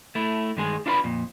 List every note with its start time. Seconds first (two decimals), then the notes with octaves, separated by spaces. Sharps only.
0.15 A3 E4
0.57 G2 D#3 G#3 G#4
0.86 D4 E4 F4 B4 D5 B5
1.04 F2 A#2